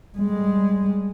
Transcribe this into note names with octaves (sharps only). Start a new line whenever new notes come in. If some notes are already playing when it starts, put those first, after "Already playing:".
G3 G#3